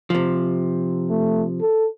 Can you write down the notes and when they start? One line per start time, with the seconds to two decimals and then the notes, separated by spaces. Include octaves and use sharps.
0.10 C3 F3
1.10 A3
1.61 A4